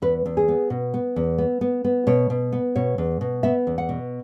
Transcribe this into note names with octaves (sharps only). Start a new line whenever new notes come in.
E2 B4
E2
G#4
B3
B2
B3
E2
B3
B3
B3
B2 C#5
B2
B3
B2 C#5
E2
B2
B3 E5
E2
F#5
B2